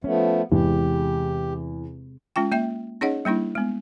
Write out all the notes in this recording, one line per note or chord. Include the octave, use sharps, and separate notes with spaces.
F3 A3 B3 C#4
E2 C3 G#3 G4
G#3 C#4 F4 G5
A#3 E5 G5
C#4 D#4 G#4 C#5 D#5 F#5
G3 A#3 D4 E4
G#3 B3